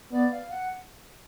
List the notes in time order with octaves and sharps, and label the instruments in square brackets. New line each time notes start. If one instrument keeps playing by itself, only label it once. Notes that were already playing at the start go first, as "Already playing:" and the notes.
[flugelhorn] B3 [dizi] D5
[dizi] F5
F#5